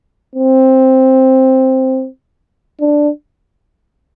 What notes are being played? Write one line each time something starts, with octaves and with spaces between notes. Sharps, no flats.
C4
D4